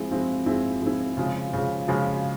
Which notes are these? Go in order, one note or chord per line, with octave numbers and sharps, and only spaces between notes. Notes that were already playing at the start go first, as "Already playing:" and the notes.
Already playing: F3 G#3 C4 E4
F3 G#3 C4 E4
F3 G#3 C4 E4
F3 G#3 C4 E4
C#3 F3 G#3
C#3 F3 G#3
C#3 F3 G#3